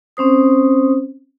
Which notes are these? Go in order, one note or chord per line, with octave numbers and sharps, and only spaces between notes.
C4 C#4 C5 D#6